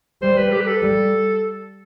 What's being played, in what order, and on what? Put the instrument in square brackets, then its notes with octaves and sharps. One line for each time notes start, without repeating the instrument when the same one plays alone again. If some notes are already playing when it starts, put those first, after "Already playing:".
[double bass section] G3 [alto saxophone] C5
[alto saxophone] B4
G4
B4
A4
[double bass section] G3